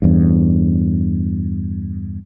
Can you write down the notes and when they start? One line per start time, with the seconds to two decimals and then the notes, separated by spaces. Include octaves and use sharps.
0.02 E2 G2